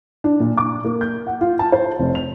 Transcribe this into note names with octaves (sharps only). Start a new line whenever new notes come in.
D4
A#2
D6
A#3
G6
F#5
F4
A5
C5
F1
F7